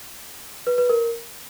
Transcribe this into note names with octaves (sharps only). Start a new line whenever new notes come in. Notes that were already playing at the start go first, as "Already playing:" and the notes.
B4
B4
A#4